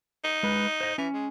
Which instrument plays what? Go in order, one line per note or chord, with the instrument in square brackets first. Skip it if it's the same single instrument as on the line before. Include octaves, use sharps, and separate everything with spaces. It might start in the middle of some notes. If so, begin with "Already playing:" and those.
[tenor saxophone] D#4
[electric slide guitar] G#3 B4
C5 D#5
[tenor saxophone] E3 [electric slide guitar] C#4
[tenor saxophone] G#3